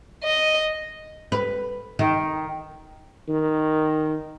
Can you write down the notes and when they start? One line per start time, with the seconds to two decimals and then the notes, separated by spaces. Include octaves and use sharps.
0.24 D#5
1.32 B4
1.99 D#3
3.29 D#3